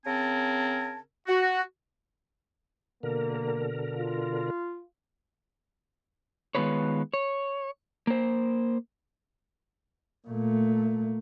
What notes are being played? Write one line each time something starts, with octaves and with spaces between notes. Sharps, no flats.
C#3 C4 A#4 G#5 A5
F#4
B2 D3 A#3 A#4
F4
D#3 G#3 B3 F4 B4 C#5
C#5
A#3 C5
A#2 A3